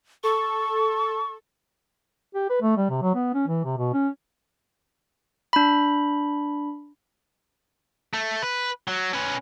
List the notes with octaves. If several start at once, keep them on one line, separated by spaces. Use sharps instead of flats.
A4 C#6
G4
B4
A3
G3
C3
F#3
B3
C#4
E3
C3
B2
C#4
D4 B5
A3
B4
F#3
C#4 B4